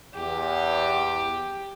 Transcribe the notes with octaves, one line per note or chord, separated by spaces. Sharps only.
E2 G4